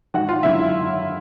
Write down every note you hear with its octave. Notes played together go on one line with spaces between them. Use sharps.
G#1 F#4 F#5
F4 F5
F#2 D3 F#3 E4 E5